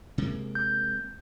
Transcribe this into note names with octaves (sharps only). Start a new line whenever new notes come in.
C3 G#3 A#3
G6